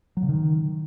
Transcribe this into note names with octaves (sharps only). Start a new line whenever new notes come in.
F#3
C#3
D#3